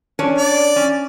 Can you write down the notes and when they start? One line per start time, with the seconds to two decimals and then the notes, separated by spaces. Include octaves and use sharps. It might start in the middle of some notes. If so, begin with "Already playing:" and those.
0.19 C#4 D4 C#5
0.38 D5
0.76 C#4